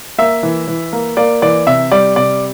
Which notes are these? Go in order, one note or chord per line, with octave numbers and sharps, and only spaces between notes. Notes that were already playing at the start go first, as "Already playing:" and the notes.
A#3 E5
E3
E3
A#3
A#3 D5
E3 D5
C3 E5
G3 D5
C3 D5